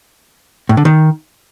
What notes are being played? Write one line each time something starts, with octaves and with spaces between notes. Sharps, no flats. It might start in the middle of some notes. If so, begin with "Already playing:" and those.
A2
D3
D#3